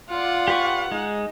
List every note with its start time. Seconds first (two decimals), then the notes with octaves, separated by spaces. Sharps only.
0.12 F4 D5 F#5
0.48 G4 B4 C#6
0.91 G#3 D#4